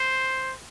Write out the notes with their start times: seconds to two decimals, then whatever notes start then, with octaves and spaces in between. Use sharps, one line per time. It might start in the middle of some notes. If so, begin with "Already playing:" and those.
Already playing: C5